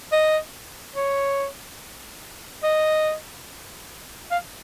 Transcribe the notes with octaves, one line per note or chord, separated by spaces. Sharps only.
D#5
C#5
D#5
F5